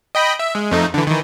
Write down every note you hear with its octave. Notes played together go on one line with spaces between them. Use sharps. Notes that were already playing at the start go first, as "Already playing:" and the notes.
D#5 G5 B5
E5
G#3
F2 A3 D#4
D3 E3
D#3 E3